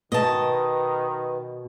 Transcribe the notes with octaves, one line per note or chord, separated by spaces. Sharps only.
B2 D#3 B4 D#5 A5